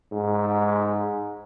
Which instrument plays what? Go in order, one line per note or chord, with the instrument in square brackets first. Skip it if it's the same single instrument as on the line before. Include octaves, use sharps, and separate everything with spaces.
[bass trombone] G#2